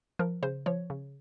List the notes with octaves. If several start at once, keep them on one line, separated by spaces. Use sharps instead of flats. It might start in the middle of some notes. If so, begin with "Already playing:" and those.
F3 A#4
C#3 C5
F3 C#5
C#3